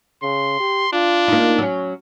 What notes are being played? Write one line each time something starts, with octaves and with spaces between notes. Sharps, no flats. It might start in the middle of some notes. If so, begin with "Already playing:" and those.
C#3 C6
G4
D4 F4
A#3 D#4
F#3 C#4